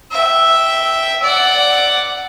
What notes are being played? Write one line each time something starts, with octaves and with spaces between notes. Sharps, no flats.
E5 G5
D5 F#5